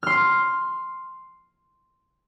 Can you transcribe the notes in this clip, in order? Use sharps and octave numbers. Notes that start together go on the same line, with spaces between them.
C6 F6